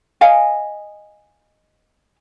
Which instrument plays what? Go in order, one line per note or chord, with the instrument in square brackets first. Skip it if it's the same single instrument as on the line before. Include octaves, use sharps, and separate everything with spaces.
[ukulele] D#5 F5 G#5